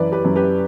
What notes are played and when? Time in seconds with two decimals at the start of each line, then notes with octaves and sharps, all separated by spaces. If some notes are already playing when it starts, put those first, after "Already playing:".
Already playing: F#2 E3 B4 D5
0.12 G4 B4
0.25 F#2
0.36 G4 B4